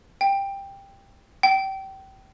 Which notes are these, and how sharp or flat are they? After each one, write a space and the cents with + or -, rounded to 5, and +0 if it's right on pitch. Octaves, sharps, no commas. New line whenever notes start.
G5 +10
G5 -25